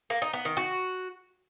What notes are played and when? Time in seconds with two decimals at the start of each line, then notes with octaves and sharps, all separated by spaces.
0.10 A#3
0.22 D#4
0.33 B3
0.45 D#3
0.57 F#4